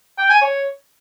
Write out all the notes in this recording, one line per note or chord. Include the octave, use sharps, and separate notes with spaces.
G5
G#5
C#5